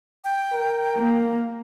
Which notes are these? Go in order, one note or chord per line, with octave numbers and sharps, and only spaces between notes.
G5
A#4
A#3